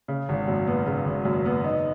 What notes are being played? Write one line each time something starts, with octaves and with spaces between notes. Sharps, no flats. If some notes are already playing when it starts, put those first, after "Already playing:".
C#3
G#1
F#2
B3
C#3
G#1
F#2
B3
D#4